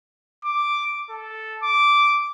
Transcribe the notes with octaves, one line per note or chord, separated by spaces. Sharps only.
D6
A4
D6